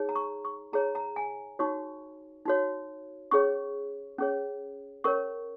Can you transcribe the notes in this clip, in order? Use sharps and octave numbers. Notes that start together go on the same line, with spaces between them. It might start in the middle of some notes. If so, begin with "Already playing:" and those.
Already playing: D#4 G#4 C#5
A#5
C#6
C#6
D#4 G#4 C#5 A#5
A#5
G#5
D#4 F#4 C#5 C#6
D#4 F#4 C#5
C#4 G#4 C#5 C#6
C#4 G#4 C#5
C#4 A#4 C#5 C#6